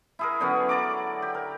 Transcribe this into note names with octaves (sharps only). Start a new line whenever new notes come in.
E4 G#4 A#4
D3 F#3 B3 C#4
D5 A#5 D6
G4
A#4